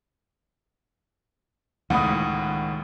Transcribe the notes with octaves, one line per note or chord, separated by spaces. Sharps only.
C#2 A2 D#3 A#3 F#5 B5 D#6